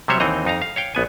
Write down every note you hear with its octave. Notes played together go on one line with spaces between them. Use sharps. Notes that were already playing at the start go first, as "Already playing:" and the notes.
C3 F#3 G3 C5 C#5 E5
D#2 E3 C4 D#4 D#5 A#5
F2 D#4 F5 A#5
F5
C#5 F5 G5
A#1 B3 G#5